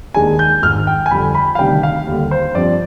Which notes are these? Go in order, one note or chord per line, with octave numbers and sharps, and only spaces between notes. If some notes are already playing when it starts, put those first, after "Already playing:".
D#2 D#3 G#3 D4 G#5
G6
G#1 G#2 D#3 F6
G5
G#5
F2 D3 G3 B5
B5
F5
D2 C3 D#3 G3 D4 G5
F5
D#2 D3 G3
C5
G2 F3 C4 D5